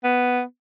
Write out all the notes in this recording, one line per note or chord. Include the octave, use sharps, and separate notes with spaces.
B3